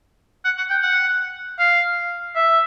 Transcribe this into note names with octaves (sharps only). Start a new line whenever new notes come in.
F#5
F#5
G5
F#5
F5
E5